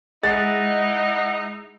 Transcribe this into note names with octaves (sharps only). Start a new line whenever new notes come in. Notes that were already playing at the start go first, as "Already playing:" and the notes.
G#3 D#4 E4 D#5 F#5 A6